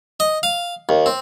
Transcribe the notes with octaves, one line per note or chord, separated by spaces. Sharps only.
D#5
F5
D#2
C4